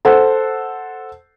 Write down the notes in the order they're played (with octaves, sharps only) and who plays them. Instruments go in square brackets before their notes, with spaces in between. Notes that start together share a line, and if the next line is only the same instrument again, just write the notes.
[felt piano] A4 C5 F#5